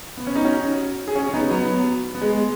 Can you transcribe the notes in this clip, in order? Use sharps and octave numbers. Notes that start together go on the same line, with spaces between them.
B3
C#4
D#4
C#4 F#4
G#4
C#4 F#4
C#4
B3 D#4
F#3 B3
B3
G#3